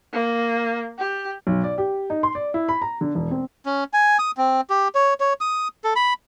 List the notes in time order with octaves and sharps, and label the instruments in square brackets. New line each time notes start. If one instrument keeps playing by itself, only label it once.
[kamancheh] A#3
G4
[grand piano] B1
D5
G4
D#4
C6
D5
E4
B5
A#5
D3
E1
C4
[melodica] C#4
G#5
D#6
C4
G4
C#5
C#5
D#6
A4
B5